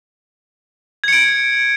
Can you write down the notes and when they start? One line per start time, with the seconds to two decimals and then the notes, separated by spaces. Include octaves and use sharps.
1.04 G#6
1.08 C#7
1.13 D7